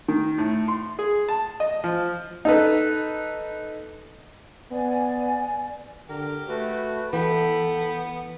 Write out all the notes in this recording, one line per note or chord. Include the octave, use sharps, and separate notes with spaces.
D#3
A2
C6
G#4
A5
D#5
F3
D#4 A4 B4
B3 D5 G#5
D3 G4 A#4
A3 F#4 B4
E3 B3 A4 G5 B5